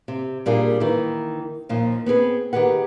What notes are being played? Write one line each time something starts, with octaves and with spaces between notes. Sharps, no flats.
C3
A#2 G3 A#3 D4 G#4
D#3 E3
D#2 A#2 F3
B3 C4 G#4 B4
D#3 G4 G#4 B4 F#5